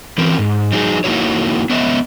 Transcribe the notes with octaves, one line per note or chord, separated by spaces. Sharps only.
E3 C4 C#4 A#4
G#2
F#3 D#4 G#4
A#3 D#4 E4 F#4 C#5
B3 C#5 D#5 E5